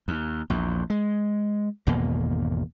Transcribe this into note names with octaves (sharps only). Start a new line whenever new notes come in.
D#2
A#1 E2
G#3
G#1 E2 B2 A#3